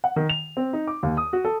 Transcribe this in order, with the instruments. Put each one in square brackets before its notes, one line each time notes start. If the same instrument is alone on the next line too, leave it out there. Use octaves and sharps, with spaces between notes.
[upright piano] F#5
D#3
F7
C4
D#4
D6
D#2
D#6
F#4
A4